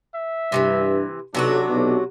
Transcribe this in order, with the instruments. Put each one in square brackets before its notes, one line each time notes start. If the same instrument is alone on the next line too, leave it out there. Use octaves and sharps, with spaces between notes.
[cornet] E5
[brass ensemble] G2 [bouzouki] C3 D#3 E3
[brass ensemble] B1 [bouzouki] C3 F#3 F#4 [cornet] D4
[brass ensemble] B1